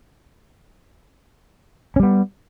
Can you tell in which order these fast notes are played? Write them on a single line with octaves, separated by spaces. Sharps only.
C#4 G3 B3